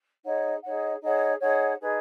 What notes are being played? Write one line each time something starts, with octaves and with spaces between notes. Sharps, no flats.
D#4 G#4 C#5 F#5
D#4 G#4 C#5 F#5
D#4 G#4 C#5 F#5
D#4 G#4 C#5 F#5
D#4 G#4 B4